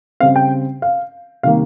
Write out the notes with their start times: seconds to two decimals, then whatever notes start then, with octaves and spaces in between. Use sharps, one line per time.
0.20 C#3 G3 C4 F5
0.36 G5
0.82 F5
1.43 C3 D#3 G3 A#3 F5